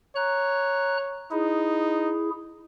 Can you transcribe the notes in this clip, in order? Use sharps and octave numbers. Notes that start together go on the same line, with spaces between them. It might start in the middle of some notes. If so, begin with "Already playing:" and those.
C#5 A#5 F#6
D#4 E4 G#4